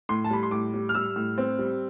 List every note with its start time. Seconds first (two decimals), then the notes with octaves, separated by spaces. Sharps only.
0.09 A2 C6
0.24 A5
0.30 G3 B5
0.43 C6
0.51 A2 D6
0.74 G3
0.89 F6
0.94 G3 E6
1.16 A2
1.38 C4
1.59 G3